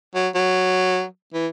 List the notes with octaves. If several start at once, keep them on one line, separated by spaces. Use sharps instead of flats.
F#3
F#3
E3